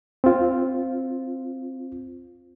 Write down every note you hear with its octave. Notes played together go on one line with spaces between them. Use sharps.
C4 F4